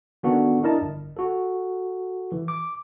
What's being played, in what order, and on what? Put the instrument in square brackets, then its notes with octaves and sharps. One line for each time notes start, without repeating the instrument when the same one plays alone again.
[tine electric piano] D#3 B3 D4 F#4 A4 F#5
D4 E4 A#4 D#5 A5
G1
F#4 A4
E3
D6